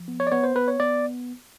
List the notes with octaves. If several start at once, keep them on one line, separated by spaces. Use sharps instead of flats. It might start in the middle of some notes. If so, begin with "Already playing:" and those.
Already playing: F3
B3
C#5
D5
B3 C#5
C5
B3 B4
C#5
B3 D5